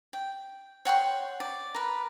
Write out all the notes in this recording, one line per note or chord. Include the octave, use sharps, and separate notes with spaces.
G5
C#5 F#5 G5 C6
D5
A#4 B4